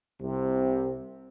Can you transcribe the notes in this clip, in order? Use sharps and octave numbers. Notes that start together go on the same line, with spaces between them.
C2 C3